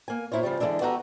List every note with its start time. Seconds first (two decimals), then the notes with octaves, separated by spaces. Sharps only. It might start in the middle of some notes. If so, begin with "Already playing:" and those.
0.08 A#3 G#5
0.32 A#2 E4 C5 C#5
0.43 C#3 F3 G3
0.60 D3 E3 G#3 A3 D4
0.81 B3 F#4 G4 A4 F5 A#5